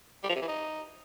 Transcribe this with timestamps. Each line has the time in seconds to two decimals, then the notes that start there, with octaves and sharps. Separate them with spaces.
0.23 G3
0.29 F3
0.35 C3
0.42 E3
0.48 D#4